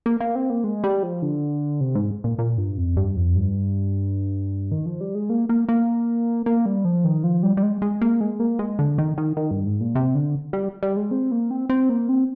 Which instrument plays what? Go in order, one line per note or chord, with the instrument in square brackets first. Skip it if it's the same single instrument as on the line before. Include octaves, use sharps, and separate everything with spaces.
[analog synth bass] A#3
A#3
C4
A#3
G#3
G3
F3
D3
C3
G#2
A#2
A#2
G2
F2
G2
F2
G2
D#3
F3
G3
G#3
A#3
A#3
A#3
A#3
G3
F3
D#3
F3
G3
G3
G#3
G#3
A#3
G#3
A#3
G#3
D3
D#3
D#3
D#3
G2
G#2
A#2
C3
D3
G3
G3
G#3
C4
A#3
C4
C4
A#3
C4